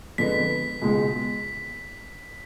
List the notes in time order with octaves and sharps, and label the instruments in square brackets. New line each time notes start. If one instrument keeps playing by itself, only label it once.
[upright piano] F2 D3 G#3 B3 [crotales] B6
[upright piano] C#2 B2 G#3